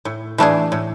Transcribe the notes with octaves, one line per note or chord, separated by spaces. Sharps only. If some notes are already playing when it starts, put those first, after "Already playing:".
A2
E3 A3 D4 G#4
A2